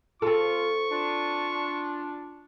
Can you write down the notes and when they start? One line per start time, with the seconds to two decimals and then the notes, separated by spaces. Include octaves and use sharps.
0.22 C4 F4 A4 C#6
0.91 D4 F4